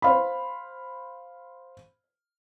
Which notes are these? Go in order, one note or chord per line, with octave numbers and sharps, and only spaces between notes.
C5 F5 B5